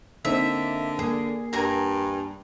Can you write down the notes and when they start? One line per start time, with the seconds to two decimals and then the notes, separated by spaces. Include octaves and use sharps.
0.25 D3 A#3 C4 D#4 E5
0.99 A#3 G#4
1.53 G2 A#4 G#5 A#5